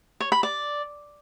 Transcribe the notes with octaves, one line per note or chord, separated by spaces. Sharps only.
C#5
B5
D5